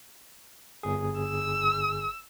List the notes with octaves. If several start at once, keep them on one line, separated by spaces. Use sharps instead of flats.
G1 G#4
E6